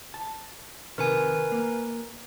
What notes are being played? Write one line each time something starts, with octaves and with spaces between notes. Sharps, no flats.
A5
C3 D#3 A#4 B4 G#5
A#3